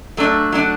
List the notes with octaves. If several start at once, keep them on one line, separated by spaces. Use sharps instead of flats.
F#3 A3 D4
F#3 A3 D4